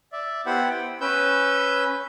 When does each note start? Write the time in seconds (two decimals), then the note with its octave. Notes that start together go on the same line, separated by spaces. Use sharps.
0.12 D5 E5
0.46 B3 E4 G4 C5 F#5 B5
0.69 G5
1.01 C#4 B4 E6 G6